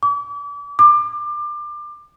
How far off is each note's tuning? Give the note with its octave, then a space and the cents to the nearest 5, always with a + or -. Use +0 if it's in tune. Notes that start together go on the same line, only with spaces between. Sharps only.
D6 -40
D6 +25